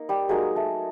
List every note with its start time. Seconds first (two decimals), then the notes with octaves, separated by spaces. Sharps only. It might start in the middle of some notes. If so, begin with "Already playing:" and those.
Already playing: A#3 D#4
0.09 G3 G4
0.29 F#3 G#3 A#3 D#4 G#4
0.56 A3 A4